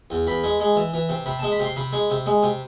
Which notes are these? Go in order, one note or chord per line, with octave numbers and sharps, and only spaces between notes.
E2
E2 B5
G#3
G#3
E3
E3
C3
C3 B5
G#3 A5
B5
C3 C6
C3 B5
G#3
C3
G#3
C3